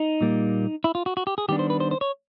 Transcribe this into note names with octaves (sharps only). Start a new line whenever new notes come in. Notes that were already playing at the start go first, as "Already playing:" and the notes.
Already playing: D#4
A#2 G3 A#3
E4
F4
F#4
F#4
G4
G#4
D#3 G3 B3 D4 G4
C5
B4
C5
C5
C#5